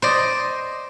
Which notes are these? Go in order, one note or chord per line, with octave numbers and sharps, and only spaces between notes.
C5 D5 D#5